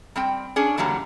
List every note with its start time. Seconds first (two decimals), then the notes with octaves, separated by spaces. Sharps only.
0.16 G3 C4 G5
0.56 C#4 D4 G#4
0.78 D3 E3 F#3 G3 A#3